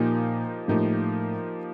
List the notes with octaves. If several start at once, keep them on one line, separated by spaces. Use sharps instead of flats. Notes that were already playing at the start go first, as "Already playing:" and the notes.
Already playing: A#2 F3 A#3 D#4 G4
A2 F3 A#3 D#4 G4